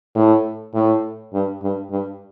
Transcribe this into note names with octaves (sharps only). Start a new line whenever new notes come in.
A2
A2
G2
G2
G2